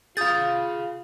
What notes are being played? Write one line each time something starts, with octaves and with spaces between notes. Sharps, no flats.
F4 G#4 F5 D#6 G6 A6